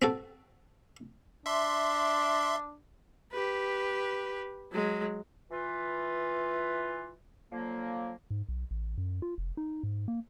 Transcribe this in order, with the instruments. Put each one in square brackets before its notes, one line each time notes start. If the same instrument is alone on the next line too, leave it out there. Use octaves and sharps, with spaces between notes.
[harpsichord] C4 F#4 A4
[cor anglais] D4 [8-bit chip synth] E5 C6
[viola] G4 B4
F#3 G#3
[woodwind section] E3 F4 B4
D3 F3 F#3 A#3
[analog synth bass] G#2
B1
A1
F#2
F4
F1
D#4
G#2
A#3